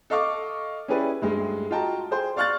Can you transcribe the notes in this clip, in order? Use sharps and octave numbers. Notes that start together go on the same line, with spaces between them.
A4 D#5 F5 C#6 D6
C#4 E4 G4 G#4 B4 D5
D2 G2 G#3
F4 F#4 D#5 G5 A5 A#5
G#4 C5 G5
D5 F5 C#6 F6 F#6 A6